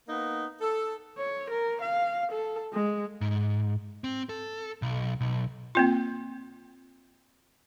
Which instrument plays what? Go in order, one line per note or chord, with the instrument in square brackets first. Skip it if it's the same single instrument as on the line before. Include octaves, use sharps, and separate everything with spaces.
[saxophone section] A#3 B3 D#4
A4
[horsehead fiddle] C#5
A#4
F5
A4
G#3
[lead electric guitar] G#2
C4
A4
B1
B1
[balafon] A#3 C4 F4